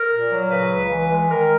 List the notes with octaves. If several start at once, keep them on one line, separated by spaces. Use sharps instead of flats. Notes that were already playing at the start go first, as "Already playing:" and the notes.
Already playing: A#4
A#2
F#3
C#3 B4
C#2
E3
G#3
D#3 A#4